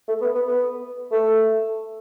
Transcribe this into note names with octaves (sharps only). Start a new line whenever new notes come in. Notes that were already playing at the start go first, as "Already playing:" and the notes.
A3
B3
B3
B3
A3